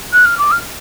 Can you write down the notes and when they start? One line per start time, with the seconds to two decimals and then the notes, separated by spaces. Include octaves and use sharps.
0.12 F#6
0.25 F6
0.38 D6
0.51 F6